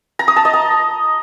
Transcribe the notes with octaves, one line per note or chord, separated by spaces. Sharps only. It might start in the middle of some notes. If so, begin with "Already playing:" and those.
A#5
D#6
A5
D#5
A#5